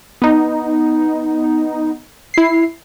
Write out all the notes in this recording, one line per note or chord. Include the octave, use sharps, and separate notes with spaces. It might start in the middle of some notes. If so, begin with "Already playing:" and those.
B3 D#4
E4 C7